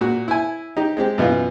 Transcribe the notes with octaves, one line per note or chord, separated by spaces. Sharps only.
A#2 F#4
E4 G#5
D#4 G4
G#3 C4 G4
F#2 B2 E3 F4